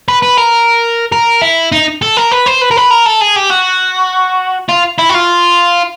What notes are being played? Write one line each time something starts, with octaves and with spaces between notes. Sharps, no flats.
B4
B4
A#4
A#4
E4
D#4
A4
A#4
B4
C5
B4
A#4
B4
A#4
A4
G#4
G4
F#4
F4
E4
F#4
F4